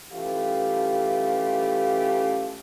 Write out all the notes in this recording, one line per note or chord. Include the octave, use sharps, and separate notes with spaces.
G2 E3 A3 C#4 F4 G4